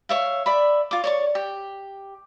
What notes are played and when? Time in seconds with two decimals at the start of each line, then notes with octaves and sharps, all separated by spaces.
0.09 C#5 E5 F5
0.46 D5 E5 B5
0.91 F4 D6
1.04 C#5 D5 C#6
1.35 G4